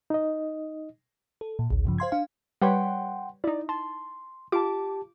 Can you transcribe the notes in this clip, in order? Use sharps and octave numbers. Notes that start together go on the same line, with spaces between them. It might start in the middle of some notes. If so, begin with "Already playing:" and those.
D#4 D#5
A4
A#2
A1 D2
G2 C#3 F3
C5 F5 C6 G#6
D4 F5
G3 B4 C#5 F#5 G5 C6
D#4 E4 D5
A5 C6
F4 G4 A5 D6